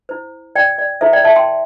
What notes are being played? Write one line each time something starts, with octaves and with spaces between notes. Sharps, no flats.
E4 C5
D5 G5
D5
E4 A4 C5 E5
D5 G5
E5 A5
G5 C6